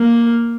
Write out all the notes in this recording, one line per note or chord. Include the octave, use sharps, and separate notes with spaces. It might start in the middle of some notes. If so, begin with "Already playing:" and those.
Already playing: A#3